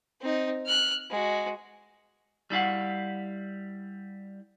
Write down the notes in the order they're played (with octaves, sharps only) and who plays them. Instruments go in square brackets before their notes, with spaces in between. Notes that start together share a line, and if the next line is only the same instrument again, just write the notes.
[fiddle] C4 D#4
F6 F#6
G#3 F#4
[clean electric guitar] G3 E4 F5 F#5